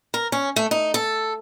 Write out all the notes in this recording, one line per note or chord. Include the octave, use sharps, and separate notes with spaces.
A#4
C#4
A3
D#4
A4